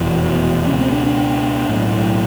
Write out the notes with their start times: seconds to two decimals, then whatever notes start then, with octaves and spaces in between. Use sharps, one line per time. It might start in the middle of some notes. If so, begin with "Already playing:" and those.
Already playing: F1 E2 B2
0.67 C#2 B2 C#4
0.81 C4
0.92 D4
1.06 D4
1.69 B1 A2